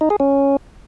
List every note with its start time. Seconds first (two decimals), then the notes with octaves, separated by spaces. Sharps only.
0.01 D#4
0.10 G#4
0.20 C#4